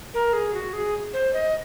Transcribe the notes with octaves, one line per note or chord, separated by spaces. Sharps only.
A#4
G#4
F#4
G#4
C5
D#5